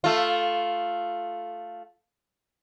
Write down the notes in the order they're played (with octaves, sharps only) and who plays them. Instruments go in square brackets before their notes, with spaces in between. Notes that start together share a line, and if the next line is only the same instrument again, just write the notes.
[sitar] A3 F4